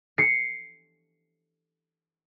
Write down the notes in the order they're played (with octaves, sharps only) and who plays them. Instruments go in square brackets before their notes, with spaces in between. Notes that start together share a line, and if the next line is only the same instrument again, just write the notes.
[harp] C7 C#7